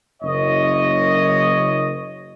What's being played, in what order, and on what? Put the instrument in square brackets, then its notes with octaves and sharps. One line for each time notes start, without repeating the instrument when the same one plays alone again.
[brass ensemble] F#1 C#5 D#5